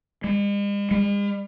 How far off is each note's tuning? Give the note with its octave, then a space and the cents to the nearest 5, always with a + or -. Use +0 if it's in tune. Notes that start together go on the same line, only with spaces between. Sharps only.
G#3 -45
G#3 -45